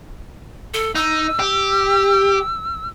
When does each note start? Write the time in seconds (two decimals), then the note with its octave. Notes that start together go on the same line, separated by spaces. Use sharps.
0.74 A4
0.95 D#4 E6
1.40 G4